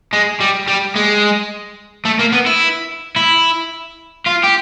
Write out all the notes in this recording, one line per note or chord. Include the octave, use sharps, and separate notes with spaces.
G#3
G3
G3
G#3
A3
A#3
B3
E4
E4
F4
G4